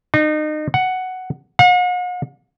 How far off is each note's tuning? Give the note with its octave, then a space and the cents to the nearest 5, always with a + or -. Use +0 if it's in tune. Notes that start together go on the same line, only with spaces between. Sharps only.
D#4 -30
F#5 +5
F#5 -45